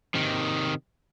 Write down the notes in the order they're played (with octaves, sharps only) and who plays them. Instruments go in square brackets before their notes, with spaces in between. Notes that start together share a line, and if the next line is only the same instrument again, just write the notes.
[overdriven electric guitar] C3 D#3